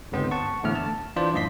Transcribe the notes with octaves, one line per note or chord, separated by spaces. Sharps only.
G1 C#2 B3 C4 C5
F#5 A5 C#6
E2 A2 D3 A3 F6
A5
E3 D4 F4 C5 D5
F#2 A2 D#5 C6 B6